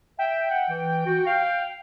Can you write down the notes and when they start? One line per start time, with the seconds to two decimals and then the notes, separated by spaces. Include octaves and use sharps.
0.19 E5 G5
0.50 F#5
0.69 E3
1.06 F#4
1.26 F5